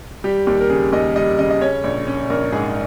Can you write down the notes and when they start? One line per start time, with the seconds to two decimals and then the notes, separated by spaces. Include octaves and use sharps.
0.24 G3 G4
0.47 D#2 G4
0.61 A#4
0.70 C#3 G#4
0.92 D#2 D#5
1.16 G3 D#5
1.39 C#3 D#5
1.51 D#5
1.61 C#4 C#5
1.84 A#1
2.07 C#4
2.30 A#1 A#4
2.52 G#2 G#4